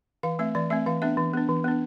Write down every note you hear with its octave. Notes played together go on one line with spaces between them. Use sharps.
E3 F5
A3 C4 E5
E3 D5
A3 C4 E5
E3 F5
B3 D4 E5
E3
B3 D4
E3
B3 D4